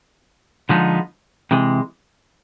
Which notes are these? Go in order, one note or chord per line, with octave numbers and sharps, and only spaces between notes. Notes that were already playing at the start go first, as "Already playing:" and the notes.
D3 F3 G#3 B3 D#4
C3 E3 G#3